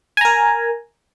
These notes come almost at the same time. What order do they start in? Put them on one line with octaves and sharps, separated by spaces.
G#5 A#5 A#4